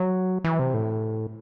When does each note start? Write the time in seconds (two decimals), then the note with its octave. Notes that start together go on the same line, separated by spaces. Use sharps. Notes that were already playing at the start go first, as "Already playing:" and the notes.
Already playing: F#3
0.44 E3
0.59 C3
0.74 A2